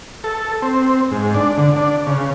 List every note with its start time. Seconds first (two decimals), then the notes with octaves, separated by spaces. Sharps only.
0.24 A4
0.62 C4
1.12 G#2
1.34 D4
1.58 D3
1.76 D4
2.07 C#3